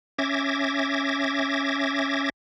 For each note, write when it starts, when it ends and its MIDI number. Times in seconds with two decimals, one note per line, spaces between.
0.19 2.30 61
0.19 2.30 76
0.19 2.30 86
0.19 2.30 92
0.19 2.30 94